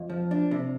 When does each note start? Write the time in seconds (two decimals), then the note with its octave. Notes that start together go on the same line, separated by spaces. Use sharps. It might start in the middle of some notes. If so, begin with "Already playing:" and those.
Already playing: F2
0.10 F3
0.31 D4
0.51 C3